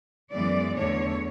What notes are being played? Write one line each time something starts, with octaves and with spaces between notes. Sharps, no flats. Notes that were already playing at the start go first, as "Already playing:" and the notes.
F#2 E3 G#3 B3 D5
E2 D3 A3 C#5